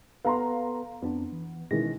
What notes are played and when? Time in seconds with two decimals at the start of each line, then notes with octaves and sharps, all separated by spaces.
0.25 B3 A4 B4 F5 A#5 C6
1.02 F2 B3 C4 D4
1.32 E3
1.71 B2 D#3 E3 G#3 C#4 A#6